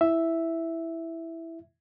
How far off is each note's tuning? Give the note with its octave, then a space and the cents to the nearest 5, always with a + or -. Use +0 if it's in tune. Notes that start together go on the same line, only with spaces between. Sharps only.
E4 +0 E5 +0